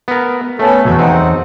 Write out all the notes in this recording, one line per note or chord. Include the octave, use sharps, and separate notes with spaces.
B3 A#4
A3 B3 C#4 A4
B1 E2 F#4
C4 D#4 F#5